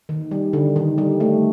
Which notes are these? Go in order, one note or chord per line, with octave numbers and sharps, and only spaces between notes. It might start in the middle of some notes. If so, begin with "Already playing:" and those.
D#3
G3
D3
D#3
G3
A3